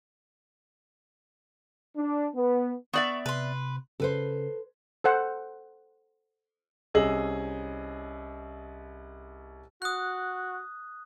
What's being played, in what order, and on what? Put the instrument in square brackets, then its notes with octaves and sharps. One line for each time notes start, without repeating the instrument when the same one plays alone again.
[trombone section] D4
B3
[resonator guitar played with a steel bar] B3 D5 E5 [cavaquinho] C#6
[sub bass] C3 [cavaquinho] B4 C6
[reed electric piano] C#3 [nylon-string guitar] A4 B4 C5
[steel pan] A4 C5 F#5
[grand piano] C2 C#4 G#4 D#5 E6 F#7
[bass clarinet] F#4 [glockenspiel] D#6 F#6